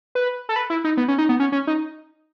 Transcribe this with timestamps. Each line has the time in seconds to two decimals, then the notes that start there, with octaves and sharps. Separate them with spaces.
0.15 B4
0.49 A4
0.56 B4
0.70 E4
0.84 D#4
0.97 B3
1.08 C#4
1.18 D#4
1.29 B3
1.40 C#4
1.52 C#4
1.67 D#4